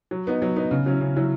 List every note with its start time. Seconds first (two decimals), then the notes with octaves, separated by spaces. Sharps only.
0.11 F#3
0.27 B3 D#4
0.42 F#3
0.56 B3 D#4
0.71 C#3
0.86 F#3 C#4 E4
1.00 C#3
1.16 F#3 C#4 E4